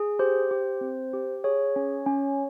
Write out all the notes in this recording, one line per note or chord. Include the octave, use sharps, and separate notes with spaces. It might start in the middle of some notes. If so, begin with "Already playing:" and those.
Already playing: G#4
G4 C5
G4
C4
G4
G#4 C#5
C#4
C#4